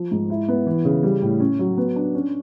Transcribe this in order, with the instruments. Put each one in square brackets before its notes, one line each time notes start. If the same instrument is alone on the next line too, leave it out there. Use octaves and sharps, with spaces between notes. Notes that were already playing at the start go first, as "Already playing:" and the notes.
Already playing: [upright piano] F3
G#2
E4
B3
E3
C#3
G3
A2
C#4
F#3
B3
D4
C#4